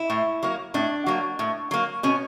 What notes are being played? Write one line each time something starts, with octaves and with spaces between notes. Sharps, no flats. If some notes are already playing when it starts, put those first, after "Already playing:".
Already playing: E4
A2
F#3 A#3
A2 D4
F#3 A#3
A2
F#3 A#3
B2 C#4